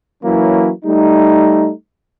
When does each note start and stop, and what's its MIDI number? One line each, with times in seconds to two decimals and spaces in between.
0.24 0.71 52
0.24 0.71 54
0.24 0.71 58
0.24 0.71 61
0.24 0.71 64
0.85 1.71 55
0.85 1.71 57
0.85 1.71 63